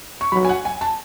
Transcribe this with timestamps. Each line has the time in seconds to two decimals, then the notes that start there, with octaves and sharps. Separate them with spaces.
0.21 C#6
0.32 F#3 B5
0.45 G#5
0.49 F#5
0.65 G#5
0.81 A5